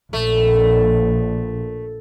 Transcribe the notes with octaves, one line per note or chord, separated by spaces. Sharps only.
A#1 A3